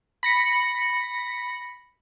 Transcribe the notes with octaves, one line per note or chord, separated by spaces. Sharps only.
B5 A#6 C#7